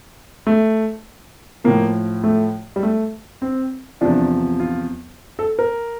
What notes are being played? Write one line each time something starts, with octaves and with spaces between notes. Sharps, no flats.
A3
A2 F3 A#3
A3
G3
A3
C4
E2 C3 F3 D4
F4
A4
A#4